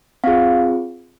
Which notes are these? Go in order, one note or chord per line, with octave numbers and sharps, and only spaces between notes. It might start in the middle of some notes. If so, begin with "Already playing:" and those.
C4 F4 G#4 F5